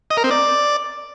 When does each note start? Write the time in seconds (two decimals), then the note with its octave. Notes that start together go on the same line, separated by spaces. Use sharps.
0.11 D#5
0.17 A#4
0.24 C4
0.31 D5